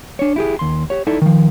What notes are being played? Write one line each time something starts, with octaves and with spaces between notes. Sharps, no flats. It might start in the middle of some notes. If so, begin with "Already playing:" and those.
D4 C#5
E4 G4 G#4
D#2 C6
G4 C#5
D#4 E4 A4 D5 E5
D#3 F3